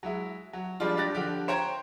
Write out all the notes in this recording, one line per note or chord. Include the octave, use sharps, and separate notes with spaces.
F#3 G#3 E4
F#3
F3 G3 G#3 D4 F4
D4 G4 F#6 A6 A#6
D3 F3 G4
C5 C#5 G5 A#5 G#6